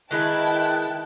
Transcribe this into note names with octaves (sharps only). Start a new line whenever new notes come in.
D#3 G#3 E4 B4 G5 A5 F#6